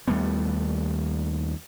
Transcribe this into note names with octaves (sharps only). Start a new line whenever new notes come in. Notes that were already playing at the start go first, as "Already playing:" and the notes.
D#2 G3 A3 B3